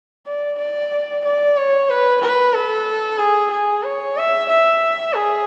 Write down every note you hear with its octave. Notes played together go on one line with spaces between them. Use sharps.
D5
D5
D5
C#5
B4
B4
A4
G#4
G#4
C#5
E5
E5
G#4